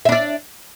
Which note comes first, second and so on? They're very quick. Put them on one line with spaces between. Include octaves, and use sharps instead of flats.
E5 D4 D5